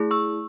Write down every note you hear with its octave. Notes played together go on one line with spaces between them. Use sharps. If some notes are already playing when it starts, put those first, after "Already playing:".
Already playing: A3 E4 G#4
C#6 E6